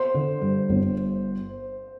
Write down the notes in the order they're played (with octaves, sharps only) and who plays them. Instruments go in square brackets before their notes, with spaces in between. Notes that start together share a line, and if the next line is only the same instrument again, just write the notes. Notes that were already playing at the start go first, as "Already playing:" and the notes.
Already playing: [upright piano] C5
[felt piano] D3
G2
G1